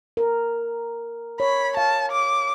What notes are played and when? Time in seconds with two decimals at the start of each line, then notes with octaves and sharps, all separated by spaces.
0.17 A#4
1.40 C#5 B5
1.77 F5 A5
2.12 D6